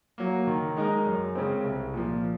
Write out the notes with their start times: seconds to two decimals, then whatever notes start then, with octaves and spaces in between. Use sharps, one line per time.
0.18 F#3 A#3
0.47 D#3
0.77 G#3 D#4 A#4
1.06 F#2
1.35 C#3 G#3 C4
1.64 C2
1.94 A#2 F3